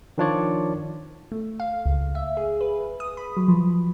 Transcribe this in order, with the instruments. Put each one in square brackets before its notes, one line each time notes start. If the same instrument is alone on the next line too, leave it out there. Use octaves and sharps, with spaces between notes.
[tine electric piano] D#3 F3 D4 F4 C#5 D5
[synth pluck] A3
F5
C#2
E5
G#4
B4
D#6
B5
F#3
F3